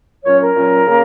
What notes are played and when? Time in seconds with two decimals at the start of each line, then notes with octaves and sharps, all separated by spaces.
0.25 A#2 F#3 C#4 C#5
0.40 A#4
0.56 A#2 F#3 C#4
0.86 C#3 A#3 C#4